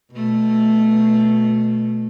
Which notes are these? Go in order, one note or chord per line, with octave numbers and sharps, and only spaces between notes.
B2 A3